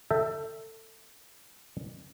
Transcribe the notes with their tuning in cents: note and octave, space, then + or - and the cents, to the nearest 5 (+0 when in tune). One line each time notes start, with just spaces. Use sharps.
A4 +25 E5 -5 G5 +0